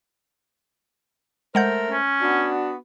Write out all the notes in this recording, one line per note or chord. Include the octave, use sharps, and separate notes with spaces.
G#3 A3 A#4 C5 F#5 G6
C#4
B3 D4 F#4